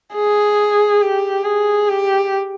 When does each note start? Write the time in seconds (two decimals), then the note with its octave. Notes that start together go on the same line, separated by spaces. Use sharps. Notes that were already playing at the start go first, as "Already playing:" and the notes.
0.14 G#4
1.01 G4
1.45 G#4
1.89 G4